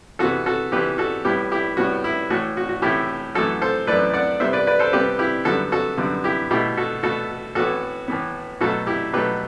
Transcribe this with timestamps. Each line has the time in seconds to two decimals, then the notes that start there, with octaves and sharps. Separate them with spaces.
0.19 C3 E3 B3 F#4 A4
0.46 F#4 A4
0.72 C3 E3 B3 G4 B4
0.98 F#4 A4
1.24 A2 G3 B3 E4 G4
1.52 E4 G4
1.77 A2 G3 B3 F#4
2.04 E4
2.30 A2 E3 A3 F#4
2.57 F#4
2.69 F#4
2.82 A2 E3 A3 E4 G4
3.35 F#2 E3 A3 F#4 A4
3.62 A4 C5
3.87 F#2 E3 A3 B4 D5
4.14 D5 F#5
4.40 C3 G3 B3 C5 E5
4.53 B4 D5
4.67 B4 D5
4.79 A4 C5
4.93 C3 G3 B3 G4 B4
5.19 E4 G4
5.45 F#2 D3 G3 B3 F#4 A4
5.72 F#4 A4
5.98 F#2 D3 G3 B3
6.24 E4 G4
6.51 B2 A3 E4 G4
6.77 F#4 A4
7.03 B2 A3 F#4 A4
7.55 A2 E3 B3 F#4 A4
8.08 A2 E3 B3
8.61 B2 F#3 A3 F#4 A4
8.87 E4 G4
9.13 B2 F#3 A3 G4 B4